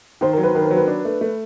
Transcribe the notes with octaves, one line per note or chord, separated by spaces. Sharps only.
D#3 C5
A#4
F#3
B4
D#3 A#4
A#4
F#3
B4
D4
A3
A3